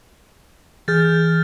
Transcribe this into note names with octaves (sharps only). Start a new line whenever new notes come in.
E3 G#4 F6 G6 A6